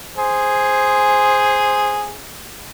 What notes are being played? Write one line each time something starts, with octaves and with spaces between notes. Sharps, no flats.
G#4 C5